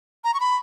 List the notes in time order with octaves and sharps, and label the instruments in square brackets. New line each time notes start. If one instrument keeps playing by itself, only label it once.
[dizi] A#5
C#6
B5